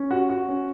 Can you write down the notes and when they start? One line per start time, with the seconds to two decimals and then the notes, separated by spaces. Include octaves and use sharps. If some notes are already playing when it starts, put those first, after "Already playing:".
Already playing: C#4
0.11 F#4
0.30 F#4
0.49 C#4